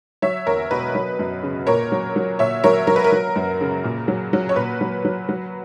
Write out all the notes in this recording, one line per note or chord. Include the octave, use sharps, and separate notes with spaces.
F#3 C#5 E5
E2 A#4 C#5
B2 B4
F#3
F#2
C#3
A#2 A#4 C#5
F#3
F#3
A#2 C#5 E5
F#3 A#4 C#5
F#3 A#4
B4
A#4
F#3
F#2
C#3
A#2
F#3
F#3
C#5
A#2 B4
F#3
F#3
F#3